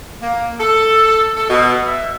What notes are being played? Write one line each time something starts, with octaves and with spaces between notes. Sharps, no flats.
A#3
A4
A4
B2
E5